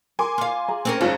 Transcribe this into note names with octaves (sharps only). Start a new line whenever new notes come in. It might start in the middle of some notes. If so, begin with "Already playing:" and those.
A#4 G#5 C6 D6
F4 F5
G#4 A#5
C4 C#4 A#4
F#1 G#2 C#4 F4